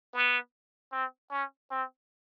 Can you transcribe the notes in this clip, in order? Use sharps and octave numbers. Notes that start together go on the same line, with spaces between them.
B3
C4
C#4
C4